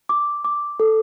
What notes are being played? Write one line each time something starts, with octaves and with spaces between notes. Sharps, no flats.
D6
D6
A4